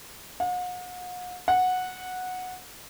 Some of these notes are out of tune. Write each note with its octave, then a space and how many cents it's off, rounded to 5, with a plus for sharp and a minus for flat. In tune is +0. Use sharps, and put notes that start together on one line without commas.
F#5 -45
F#5 -10